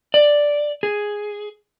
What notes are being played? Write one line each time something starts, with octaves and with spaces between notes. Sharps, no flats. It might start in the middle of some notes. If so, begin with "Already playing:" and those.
D5
G#4